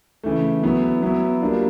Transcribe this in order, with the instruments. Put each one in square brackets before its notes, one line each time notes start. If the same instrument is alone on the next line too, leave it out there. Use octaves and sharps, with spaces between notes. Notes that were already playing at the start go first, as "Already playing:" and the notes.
[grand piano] C#3 E3 A3
F#3 B3 E4
F#3 B3 E4
G3 A#3 D4 F4